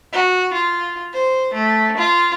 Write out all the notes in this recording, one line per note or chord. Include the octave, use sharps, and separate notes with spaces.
F#4
F4
C5
A3
F4